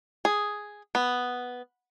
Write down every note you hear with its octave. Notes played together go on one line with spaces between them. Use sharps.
G#4
B3